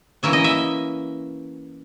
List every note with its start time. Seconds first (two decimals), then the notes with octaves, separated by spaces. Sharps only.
0.23 E3 A#3 C#4 E5
0.33 D#5
0.44 E5